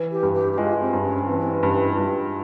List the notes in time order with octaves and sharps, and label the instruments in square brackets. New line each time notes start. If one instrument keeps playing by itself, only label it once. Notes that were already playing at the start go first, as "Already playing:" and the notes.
Already playing: [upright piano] E3
[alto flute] G4
[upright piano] G2
[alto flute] G4
G4
[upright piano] G#3 [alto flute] F4
[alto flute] C4
[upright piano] G2
[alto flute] C#4
[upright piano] E3 [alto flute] C4
[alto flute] C4
C#4
[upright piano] G2 [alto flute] C#4
[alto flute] E4
G4
[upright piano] G2 [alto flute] F4